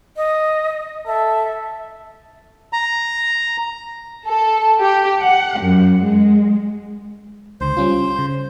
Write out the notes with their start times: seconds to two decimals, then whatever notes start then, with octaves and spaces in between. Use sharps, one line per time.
0.17 D#5
1.07 A4 E5
2.73 A#5
4.26 A4
4.80 G4
5.22 F#5
5.61 F#2
6.03 G#3
7.61 C#2 D3 C5
7.77 G3 C#4 F4
8.19 C#3